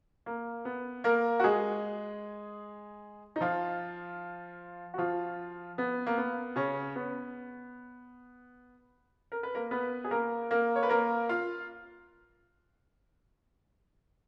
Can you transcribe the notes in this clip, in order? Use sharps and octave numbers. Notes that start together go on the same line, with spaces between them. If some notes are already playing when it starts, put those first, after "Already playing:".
A#3
B3
A#3 A#4
F#4
G#3 G#4
D#4
F3 F4
F#4
F3 F4
B3
A#3
B3
C#3 C#4
B3
A#4
B4
A#3 A#4
B3 B4
G#4
A#3 A#4
A#3 A#4
C#5
B4
A#3 A#4
F4 F5